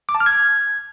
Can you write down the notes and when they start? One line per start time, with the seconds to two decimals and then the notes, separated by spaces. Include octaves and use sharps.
0.09 D6
0.15 A5
0.20 F6
0.26 G#6